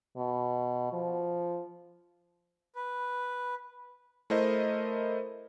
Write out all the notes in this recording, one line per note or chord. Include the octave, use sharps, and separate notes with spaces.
B2
F3
B4
A3 E4 A#4 C5 D#5